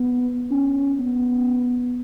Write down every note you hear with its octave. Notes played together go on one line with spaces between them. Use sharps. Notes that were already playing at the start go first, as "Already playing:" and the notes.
Already playing: B3
C#4
B3